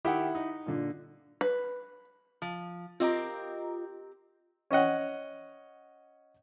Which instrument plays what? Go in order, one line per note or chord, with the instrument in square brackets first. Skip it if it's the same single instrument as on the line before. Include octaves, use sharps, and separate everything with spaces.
[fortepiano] D#3 G4 E5 [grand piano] E4 F#5
[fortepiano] D#4
[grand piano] A#2 D3
[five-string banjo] B4
[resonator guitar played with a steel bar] F3
[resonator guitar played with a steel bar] C4 G4 A#4 [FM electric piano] F4 D#5 A#5
[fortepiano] C#4 C#5 D#5 F#5